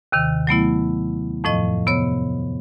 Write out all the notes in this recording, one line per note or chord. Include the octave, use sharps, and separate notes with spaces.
D#2 C3 D#3
F#3 A3 B3 E4
F2 A2 F3 D#5
C3 B3 C#5